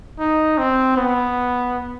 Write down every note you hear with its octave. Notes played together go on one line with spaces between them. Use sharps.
D#4
C4
B3